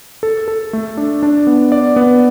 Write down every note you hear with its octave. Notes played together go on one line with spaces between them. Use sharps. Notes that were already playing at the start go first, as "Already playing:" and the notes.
A4
A4
A3
D4
D4
B3
D5
B3